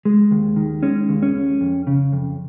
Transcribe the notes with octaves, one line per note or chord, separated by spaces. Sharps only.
G#3
D#2
D#3
G#3 C#4
D#2
C#4
D#2
F2
C#3
F2